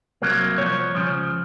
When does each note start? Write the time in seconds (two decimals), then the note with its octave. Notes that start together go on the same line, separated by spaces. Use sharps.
0.22 C2 C3 F#3 A#3
0.58 C2 C3 F3 C#5
0.95 C#2 C#3 F3